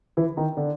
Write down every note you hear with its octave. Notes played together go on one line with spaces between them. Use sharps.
E3 E4
D#3 D#4
D3 D4